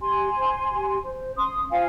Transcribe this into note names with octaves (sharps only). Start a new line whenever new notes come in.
G4 G#5 C6
C5
G4
C5
C#4 C6 D#6
F4 C5 F5 G#5